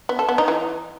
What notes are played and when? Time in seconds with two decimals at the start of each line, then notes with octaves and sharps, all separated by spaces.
0.09 B3
0.19 A4
0.29 B3
0.38 D#4
0.48 E3